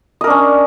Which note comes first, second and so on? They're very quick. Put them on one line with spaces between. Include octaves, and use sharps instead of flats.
D#5 A#4 D4 C#4